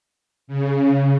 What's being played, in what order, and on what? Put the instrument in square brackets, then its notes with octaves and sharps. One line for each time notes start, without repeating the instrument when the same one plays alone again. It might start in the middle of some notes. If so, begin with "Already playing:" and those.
[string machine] C#3